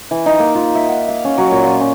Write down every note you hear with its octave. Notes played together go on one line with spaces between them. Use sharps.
E3
D#4
A#3
F4
E5
F#5
F5
C#4
F#3
A#2
F4
C#4